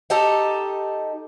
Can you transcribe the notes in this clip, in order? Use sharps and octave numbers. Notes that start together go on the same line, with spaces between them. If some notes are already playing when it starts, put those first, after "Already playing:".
D#4 G4 A4